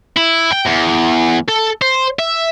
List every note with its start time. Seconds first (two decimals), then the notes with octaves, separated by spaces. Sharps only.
0.16 E4
0.52 G5
0.66 E2
1.48 A4
1.81 C5
2.19 E5